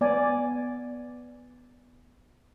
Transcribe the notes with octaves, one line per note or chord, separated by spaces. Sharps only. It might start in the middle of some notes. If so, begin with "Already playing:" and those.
B3 D5 G#5